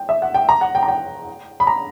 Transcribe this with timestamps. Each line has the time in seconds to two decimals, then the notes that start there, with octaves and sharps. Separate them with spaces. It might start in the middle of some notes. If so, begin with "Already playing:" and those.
Already playing: G5
0.09 E5
0.22 F#5
0.34 G5
0.49 A#5
0.61 F#5
0.75 G5
0.83 A#5
0.88 G5
1.60 B5
1.67 A#5